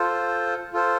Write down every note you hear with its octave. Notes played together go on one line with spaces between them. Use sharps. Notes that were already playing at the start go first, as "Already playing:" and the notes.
Already playing: F4 A4 C5
F4 A4 C5